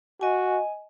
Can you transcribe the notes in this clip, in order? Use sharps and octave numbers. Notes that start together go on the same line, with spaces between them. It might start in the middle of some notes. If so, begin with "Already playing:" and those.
F#4 D#5 G#5